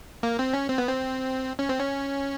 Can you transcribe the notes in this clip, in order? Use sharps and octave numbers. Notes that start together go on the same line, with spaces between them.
A#3
C4
C#4
C4
B3
C4
C#4
C4
C#4